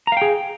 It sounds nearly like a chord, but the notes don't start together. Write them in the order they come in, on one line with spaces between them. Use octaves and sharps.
A#5 F5 G5 G#4